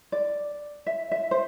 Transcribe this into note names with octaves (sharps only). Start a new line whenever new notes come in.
D5
E5
E5
C5